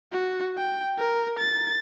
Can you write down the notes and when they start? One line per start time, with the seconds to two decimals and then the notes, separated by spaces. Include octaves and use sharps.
0.12 F#4
0.57 G5
0.98 A#4
1.39 A6